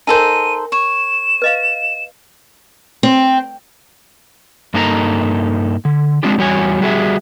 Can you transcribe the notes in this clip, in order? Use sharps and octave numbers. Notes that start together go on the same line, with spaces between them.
D#4 A4 A#4 C5 G5 G#5 D#7
C#5 E7
B4 D#5 F5
C4
G2 A#3 D#4 A4 G#5 A#5
D3
G#3 C4 D4 F4 G4
E2 G3 F#4 C#5 G#5
G3 F#4 G#4 E5